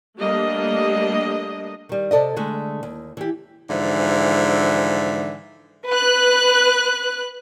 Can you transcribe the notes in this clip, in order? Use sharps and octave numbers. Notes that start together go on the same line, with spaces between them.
G3 A3 A#3 D4 D#5
D#3 G3
C3 A4 D5 D#5
D3 G#3 A3
D#2
E3 G4
G#2 D3 E3 F3
B4 F#6